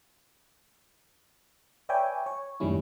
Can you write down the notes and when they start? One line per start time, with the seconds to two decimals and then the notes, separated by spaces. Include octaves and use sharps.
1.89 B4 C#5 D5 E5 G5 G#5
2.26 C#5
2.60 F#2 A2 D#3 G3 C#4 E4